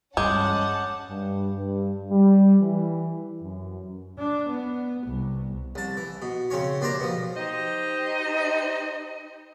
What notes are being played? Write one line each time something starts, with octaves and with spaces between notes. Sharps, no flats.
E2 G2 G#3 C#4 F#5 A5 D6 G6
G2
G2
G3
E3
F#2
D4
B3
C2
C2 A5
E3
B2
C#3 C4 C#4 C#5
D#2 D4 G4 C5 A#5
B2 F3
D#4 G4 C5 D#5